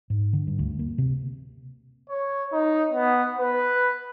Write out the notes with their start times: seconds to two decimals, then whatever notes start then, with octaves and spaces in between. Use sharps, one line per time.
0.10 G#2
0.33 D3
0.47 G2
0.59 D2
0.79 A#3
0.98 C3
2.09 C#5
2.52 D#4
2.92 B3
3.39 B4